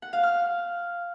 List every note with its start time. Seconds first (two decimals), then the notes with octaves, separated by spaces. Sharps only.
0.02 F#5
0.13 F5
0.23 F6